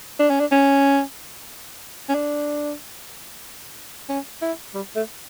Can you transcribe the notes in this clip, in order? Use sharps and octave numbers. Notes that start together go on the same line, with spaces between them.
D4
C#4
D4
C#4
C#4
D4
C#4
E4
G3
A3